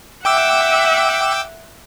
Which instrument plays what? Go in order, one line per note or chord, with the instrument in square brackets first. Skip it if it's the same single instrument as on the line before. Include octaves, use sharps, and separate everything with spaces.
[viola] E5 F#5 [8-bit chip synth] G5 D6 E6